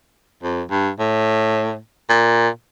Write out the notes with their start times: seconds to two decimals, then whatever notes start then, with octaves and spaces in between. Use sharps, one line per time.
0.43 F2
0.71 G2
0.99 A2
2.09 A#2